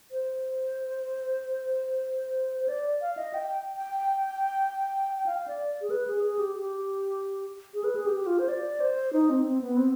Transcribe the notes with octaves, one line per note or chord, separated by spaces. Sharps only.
C5
C5
D5
F5
D#5
G5
G5
G5
F5
D5
G#4
B4
G#4
G#4
G4
G4
G#4
B4
G#4
G4
G4
F4
C5
D5
C5
D#4
C4
C4
B3
C4